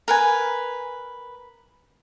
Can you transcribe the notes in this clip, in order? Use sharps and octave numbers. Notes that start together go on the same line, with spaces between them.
A#4 B4 G#5